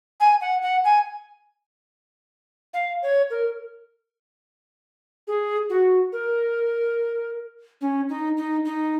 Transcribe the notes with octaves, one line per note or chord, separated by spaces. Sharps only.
G#5
F#5
F#5
G#5
F5
C#5
A#4
G#4
F#4
A#4
C#4
D#4
D#4
D#4